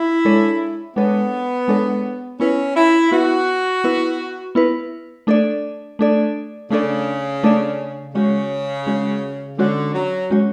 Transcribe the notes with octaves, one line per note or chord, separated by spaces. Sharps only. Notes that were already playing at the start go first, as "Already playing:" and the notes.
Already playing: E4
G#3 D4 A4 C#5
G#3 B3 D4 A4 C#5
G#3 D4 A4 C#5
B3 C#4 E4 B4
E4
B3 E4 F#4 B4
B3 E4 B4
B3 E4 B4
A3 D4 A4 D5
A3 D4 A4 D5
C#3 A3 D4 A4 D5
A3 D4 A4 D5
C#3 G#3 C#4 F#4 C#5
G#3 C#4 F#4 C#5
D3 G#3 C#4 F#4 C#5
F#3
G#3 C#4 F#4 C#5